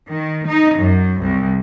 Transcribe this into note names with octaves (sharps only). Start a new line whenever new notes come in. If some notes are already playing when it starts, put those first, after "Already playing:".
D#3
D#4
F#2
C2